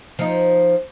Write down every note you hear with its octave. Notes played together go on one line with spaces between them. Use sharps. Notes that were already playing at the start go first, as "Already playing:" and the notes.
F3 D#4